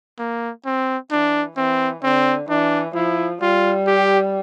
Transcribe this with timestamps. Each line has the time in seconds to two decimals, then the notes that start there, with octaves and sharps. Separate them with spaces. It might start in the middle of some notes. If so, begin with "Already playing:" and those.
0.19 A#3
0.65 C4
1.11 E3 D4
1.57 E3 C4
2.03 D3 C4
2.49 E3 D4
2.95 F3 E4
3.41 G3 F4
3.87 G4